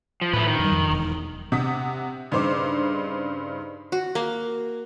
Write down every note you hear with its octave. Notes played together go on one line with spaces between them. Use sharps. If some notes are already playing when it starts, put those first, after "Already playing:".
F3
A2 F3 A3 B4
D#3
F#2 G3
F2
E1
C3 F#5 D#6 B6
G2 C#3 D#4 C5 D6
F#4
A#3